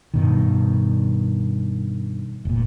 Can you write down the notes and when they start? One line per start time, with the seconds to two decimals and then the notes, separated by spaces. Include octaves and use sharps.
0.14 G2 B2 D#3
2.45 F1 A#2